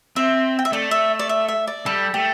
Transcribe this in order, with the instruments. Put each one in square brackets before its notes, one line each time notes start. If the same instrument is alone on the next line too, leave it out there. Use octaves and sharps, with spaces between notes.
[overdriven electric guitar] C4 [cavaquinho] E5
[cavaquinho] G5
E5
[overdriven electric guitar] A3 [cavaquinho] D5
[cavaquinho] E5
D5
E5
E5
D5
[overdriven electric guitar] G3 [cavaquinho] A4
[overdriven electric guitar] A3 [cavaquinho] G4